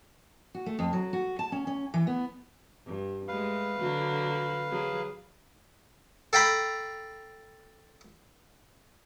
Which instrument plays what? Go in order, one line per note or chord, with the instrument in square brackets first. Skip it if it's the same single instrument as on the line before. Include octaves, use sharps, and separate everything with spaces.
[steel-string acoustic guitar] F#4
A3
F2
F#3
F#4
A5
C#4
C#4
E3
B3
[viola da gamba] G2
[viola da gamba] G#3 A3 [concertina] B4 F5
[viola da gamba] D3 F#3 F#4
F#3 G#4
[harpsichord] A4 F5 G5 A#5 B5